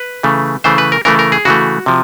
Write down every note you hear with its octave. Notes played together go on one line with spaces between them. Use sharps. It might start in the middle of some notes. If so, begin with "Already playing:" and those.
Already playing: B4
C#3 E3 A3
C#3 E3 A3 C5
B4
A#4
C#3 E3 A3 A#4
A#4
G#4
C#3 E3 A3 F#4
C3 F3